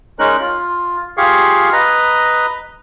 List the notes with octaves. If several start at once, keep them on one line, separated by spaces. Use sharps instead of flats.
G#3 C#4 D#4 A#4 F#6
F4
F4 G4 G#4 F5 C#6
B4 D#5 A#5